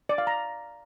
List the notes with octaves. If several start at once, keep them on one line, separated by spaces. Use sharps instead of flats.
D5
F5
A#5